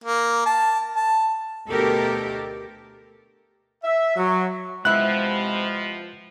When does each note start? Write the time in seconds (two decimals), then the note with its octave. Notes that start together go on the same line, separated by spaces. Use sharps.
0.04 A#3
0.46 A5
0.96 A5
1.68 D2 B2 G4 A4 A#4
3.84 E5
4.17 F#3
4.85 C3 F3 G#3 B3 E4 F#6